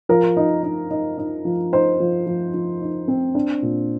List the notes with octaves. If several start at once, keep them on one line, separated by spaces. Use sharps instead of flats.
F3 A#4
D#4
D#4
D#4
D#4
F3
D#4 C5
F3
F3
F3
D#4
C4
D4
A#2